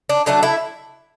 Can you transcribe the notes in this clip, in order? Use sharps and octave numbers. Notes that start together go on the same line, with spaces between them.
D4
D3 F#3 A3 D4
E4